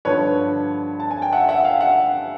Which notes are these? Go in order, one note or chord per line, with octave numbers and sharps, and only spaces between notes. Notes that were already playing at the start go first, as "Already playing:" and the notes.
G2 D3 F3 B4 C#5
A5
G#5
G5
E5 F#5
E5 F#5
F5 G5
E5 F#5